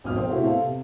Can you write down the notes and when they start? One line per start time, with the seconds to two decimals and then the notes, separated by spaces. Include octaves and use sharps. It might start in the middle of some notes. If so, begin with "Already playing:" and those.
0.04 G#1 F2 B2 D#6 F6
0.16 A4 C5 G5
0.29 A2 C3 C4 E4 F#4 G#4
0.44 B3 A4 C5 F5
0.61 C3